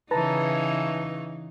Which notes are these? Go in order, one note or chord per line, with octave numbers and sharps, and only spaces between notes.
C#3 E3 D#4 B4 A5 A#5